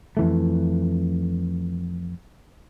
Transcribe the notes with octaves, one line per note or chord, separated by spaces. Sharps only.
F2 E3 A3